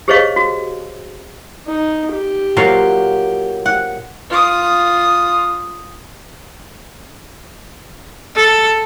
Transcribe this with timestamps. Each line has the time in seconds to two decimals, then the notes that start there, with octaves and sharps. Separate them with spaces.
0.08 G4 G#4 C5 C#5 D#5 F5
0.36 F#4
1.66 D#4
2.13 G4
2.57 A#2 F#3 F5
3.66 F#5
4.30 F4 D#6
8.36 A4